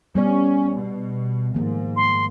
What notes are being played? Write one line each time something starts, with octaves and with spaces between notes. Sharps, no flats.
G3 B3 C#4 D5
B2
G#2 D#3 F3 A#3
C6